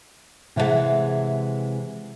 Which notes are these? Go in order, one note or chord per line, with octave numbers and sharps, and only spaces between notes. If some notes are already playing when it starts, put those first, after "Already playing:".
C3 E3 G#3 A#4 E5 F#5